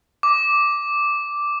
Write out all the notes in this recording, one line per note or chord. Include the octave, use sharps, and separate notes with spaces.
D6